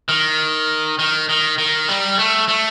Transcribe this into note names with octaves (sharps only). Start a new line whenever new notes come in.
D#3
D#3
D#3
D#3
G3
A3
A3